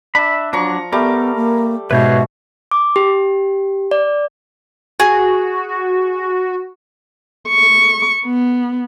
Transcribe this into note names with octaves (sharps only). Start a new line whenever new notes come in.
D4 E5 B5
F3 F#3 D4 A#5 C#6
G3 A3 B3 A#4 D6
A#3
G#2 B2 B4 C#5 E5 G6
D6
G4
D5
F#4 G#4
C#6
B3